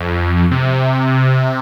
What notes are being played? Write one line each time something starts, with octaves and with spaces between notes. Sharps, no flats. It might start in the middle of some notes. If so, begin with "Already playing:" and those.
Already playing: F2
C3